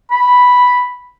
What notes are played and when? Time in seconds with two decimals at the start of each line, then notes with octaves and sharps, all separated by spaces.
0.11 B5